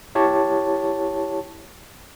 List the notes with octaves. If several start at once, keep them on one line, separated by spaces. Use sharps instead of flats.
E4 G4 C#5 A5